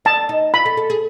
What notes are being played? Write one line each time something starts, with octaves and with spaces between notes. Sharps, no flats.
D4 A5
D#4
F4 B5
A4
A4
G#4